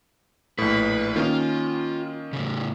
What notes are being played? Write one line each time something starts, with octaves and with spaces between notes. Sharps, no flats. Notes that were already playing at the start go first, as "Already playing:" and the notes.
A#1 A2 B4
D#3 A#3 C#4 F4
A2 C#3